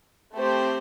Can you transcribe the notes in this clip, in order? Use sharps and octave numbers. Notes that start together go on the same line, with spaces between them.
A3 C4 G4 C5